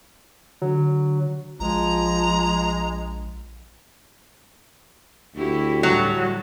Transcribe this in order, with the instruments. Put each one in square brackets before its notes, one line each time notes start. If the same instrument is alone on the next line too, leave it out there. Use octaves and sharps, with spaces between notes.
[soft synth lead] D3 [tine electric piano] F#3
[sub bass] A#1 [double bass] F3 [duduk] G#3 [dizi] A#5
[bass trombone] D2 [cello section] E4 [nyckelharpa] F#4 G4
[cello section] A2 D3 G3 [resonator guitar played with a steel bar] F#3